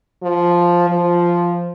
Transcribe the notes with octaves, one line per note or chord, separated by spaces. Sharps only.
F3
F3